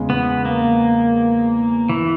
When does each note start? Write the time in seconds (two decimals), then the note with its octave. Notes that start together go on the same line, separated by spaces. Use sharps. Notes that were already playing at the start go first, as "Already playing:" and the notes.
Already playing: E2 C#3 G#3
0.10 B3
0.45 A#3
1.89 E3